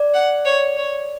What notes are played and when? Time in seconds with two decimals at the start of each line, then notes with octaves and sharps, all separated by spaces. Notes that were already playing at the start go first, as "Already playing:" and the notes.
Already playing: D5
0.14 F#5
0.45 C#5
0.77 C#5